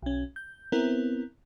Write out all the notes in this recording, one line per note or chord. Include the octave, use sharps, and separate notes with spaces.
B1 C#4
G6
B3 C4 E4 A#4